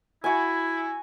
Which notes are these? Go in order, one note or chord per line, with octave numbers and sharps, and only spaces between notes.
E4 F#4 G#5